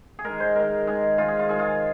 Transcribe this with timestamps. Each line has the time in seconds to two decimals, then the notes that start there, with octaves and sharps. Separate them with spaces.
0.19 G#4
0.24 D#3 G#3 A#4
0.40 C5
0.55 D#3 G#3 A#4
0.87 D#3 G#3 G#4
1.18 D#3 G#3 F4
1.28 G#4
1.39 F4
1.49 D#3 G#3 G#4
1.59 F4